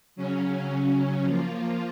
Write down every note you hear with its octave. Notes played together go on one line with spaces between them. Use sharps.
C#3 F#3 C#4
F3 A#3 F4